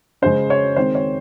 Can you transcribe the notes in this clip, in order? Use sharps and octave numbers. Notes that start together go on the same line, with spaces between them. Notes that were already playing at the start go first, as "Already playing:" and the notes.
C#3 G#3 C#4 C5
C#5
D#3 G#3 C4 D#4 C5
C#5